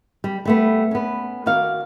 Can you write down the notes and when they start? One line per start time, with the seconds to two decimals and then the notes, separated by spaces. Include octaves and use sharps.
0.24 G3
0.45 G3 A3 B3
0.91 B3 C#4
1.46 D#3 F#4 D5 F5